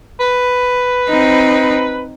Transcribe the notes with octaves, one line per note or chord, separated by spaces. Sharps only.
B4
C4 D#4